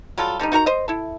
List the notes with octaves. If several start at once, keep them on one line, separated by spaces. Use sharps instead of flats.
F#3 G3 F4 A4
D3 G3 C#4 D#4
D#4 F#4 A#4 A#5
C5 D#5
E4 A4